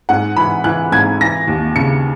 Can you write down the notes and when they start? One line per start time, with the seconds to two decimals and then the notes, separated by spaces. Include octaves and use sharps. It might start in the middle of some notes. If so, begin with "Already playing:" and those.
0.09 G#2 F#5
0.36 E3 B5
0.64 E3 F#6
0.92 G#2 G#6
1.21 E3 A#6
1.48 D#2
1.76 C#3 C#7